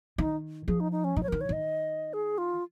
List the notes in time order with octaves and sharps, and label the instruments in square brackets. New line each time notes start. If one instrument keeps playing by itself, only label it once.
[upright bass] D#3 [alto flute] D#4
[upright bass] F3 [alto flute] G#4
[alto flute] D#4
D#4
C#4
[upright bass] F3 [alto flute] D#4
[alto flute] C#5
[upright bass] D#3 [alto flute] A#4
[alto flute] C#5
[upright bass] D#3 [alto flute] D#5
[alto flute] G#4
F4